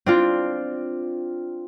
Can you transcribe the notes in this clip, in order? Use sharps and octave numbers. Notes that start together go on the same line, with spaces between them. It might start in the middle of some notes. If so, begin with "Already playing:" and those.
C4 D4 F4